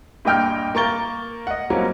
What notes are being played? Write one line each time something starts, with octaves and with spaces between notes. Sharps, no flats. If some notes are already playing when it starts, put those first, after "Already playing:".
G2 A#2 D#5 G5 F6 G6
A#3 A#4 C#6 A6 G7
D#5 F#5
F#3 G3 A#3 C4 C#4 A#4